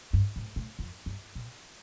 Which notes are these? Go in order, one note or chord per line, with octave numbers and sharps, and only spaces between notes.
G2
A2
A2
F2
G2
A#2